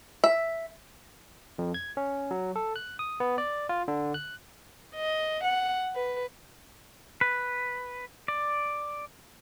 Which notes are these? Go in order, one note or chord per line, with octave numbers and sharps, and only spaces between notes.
E5
F2
G#6
C#4
F#3
A4
F#6
D#6
B3
D5
F4
D3
F#6
D#5
F#5
B4
B4
D5